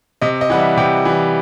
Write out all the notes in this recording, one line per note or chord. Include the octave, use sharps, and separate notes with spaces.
C3 D#5
D#5
E3 G3 F#5
E5
C3 G5
E3 G3